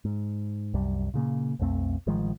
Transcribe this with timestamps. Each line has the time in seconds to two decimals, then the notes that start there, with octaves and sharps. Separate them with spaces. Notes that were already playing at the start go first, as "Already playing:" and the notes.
0.05 G#2
0.74 C2 F#2 G3
1.14 A#2 C#3 A#3
1.59 B1 F2 A3 C4
2.07 A1 D#3 F3 G#3